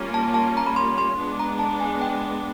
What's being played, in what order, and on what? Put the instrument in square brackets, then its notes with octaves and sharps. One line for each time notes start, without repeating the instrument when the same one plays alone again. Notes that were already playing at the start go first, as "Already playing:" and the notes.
Already playing: [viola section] G3 A#3 C#4 F4
[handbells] A5
A5
A#5
B5
C6
C6
[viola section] G#3 B3 D4
[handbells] A#5
A5
G#5
G5